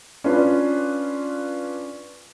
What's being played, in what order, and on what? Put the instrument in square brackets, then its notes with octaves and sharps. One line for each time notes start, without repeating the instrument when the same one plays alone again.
[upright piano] C#4 D4 F4 B4